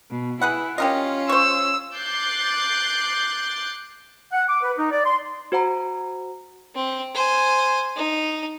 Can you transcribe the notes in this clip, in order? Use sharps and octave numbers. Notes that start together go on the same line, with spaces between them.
B2
E4 G#4 B4 F#5
C#4 F4 G4 A#4 D#5
C5 C#5 E6
D6 F#6 G6 A6 C7
F#5
D6
B4
D#4
D5
C6
F#4 C5 F#5 A#5 B5
C4
C5 G#5
D#4